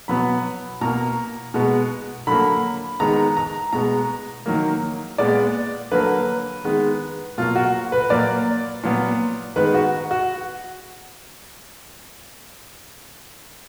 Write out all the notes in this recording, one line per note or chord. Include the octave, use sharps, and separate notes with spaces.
B2 F#3 B3 B5
B2 A#3 A#5
B2 G#3 B3
D3 F#3 A#3 B5
D#3 G#3 B3 A#5
A#5
B2 G#3 B3 A#5
D#3 F#3 A#3
A#2 G#3 B3 D5
D3 F#3 A#3 B4
D#3 G#3 B3
B2 F#3 A#3 F4
F#4
B4
A#2 F#3 A#3 D5
A#2 F#3 B3
D#3 G#3 B3 B4
F#4
F#4